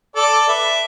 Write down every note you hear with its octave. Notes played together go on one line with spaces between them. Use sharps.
A4 D5
B4 E5